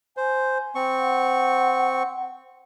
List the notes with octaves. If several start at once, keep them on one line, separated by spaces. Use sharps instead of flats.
C5 G#5
C4 C#6
F#5